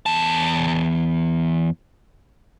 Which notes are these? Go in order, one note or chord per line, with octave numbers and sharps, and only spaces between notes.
E2 A5